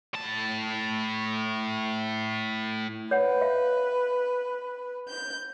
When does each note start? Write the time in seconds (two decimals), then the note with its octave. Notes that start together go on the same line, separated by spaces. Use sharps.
0.14 A2 A5
3.11 B4 C#5 F#5
3.41 E5 F5
5.06 G6